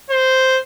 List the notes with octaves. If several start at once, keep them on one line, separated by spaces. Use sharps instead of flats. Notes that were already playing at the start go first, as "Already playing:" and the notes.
C5